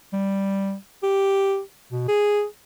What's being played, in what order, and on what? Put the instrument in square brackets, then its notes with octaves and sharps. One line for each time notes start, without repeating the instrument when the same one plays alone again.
[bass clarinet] G3
G4
B2
G#4